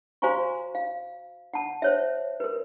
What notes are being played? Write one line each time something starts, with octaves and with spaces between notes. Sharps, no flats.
F#4 C5 F5 G#5 A#5 C#6
F5
F#5 A5
C5 C#5 E5
A#4 B4